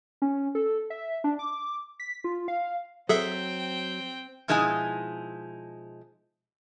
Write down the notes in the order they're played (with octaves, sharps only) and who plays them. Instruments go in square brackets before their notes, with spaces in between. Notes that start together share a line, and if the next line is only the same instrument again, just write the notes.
[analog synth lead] C#4
A4
E5
D4
D6
B6
F4
F5
[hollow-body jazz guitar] F#3 [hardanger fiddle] C4 G5 [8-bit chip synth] G#4 A4 E5
[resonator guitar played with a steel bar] B2 F3 G#3 D#4 E4 G#5